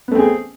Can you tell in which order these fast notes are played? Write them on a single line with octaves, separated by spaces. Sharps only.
B3 A3 C4 G#4